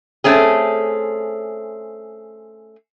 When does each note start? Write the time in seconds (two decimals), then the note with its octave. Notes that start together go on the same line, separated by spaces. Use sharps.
0.24 A3 C4 C#4 G#4